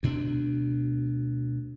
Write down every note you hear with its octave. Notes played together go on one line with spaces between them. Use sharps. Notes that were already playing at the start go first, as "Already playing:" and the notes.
D2 B2 D4